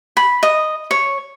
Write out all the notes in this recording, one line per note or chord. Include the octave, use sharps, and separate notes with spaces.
B5
D#5
C#5